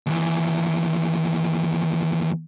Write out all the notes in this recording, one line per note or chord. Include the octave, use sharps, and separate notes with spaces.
D#2 E3